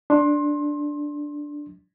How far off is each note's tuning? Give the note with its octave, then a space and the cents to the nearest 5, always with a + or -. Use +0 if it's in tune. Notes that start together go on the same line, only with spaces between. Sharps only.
D4 +0 C6 +20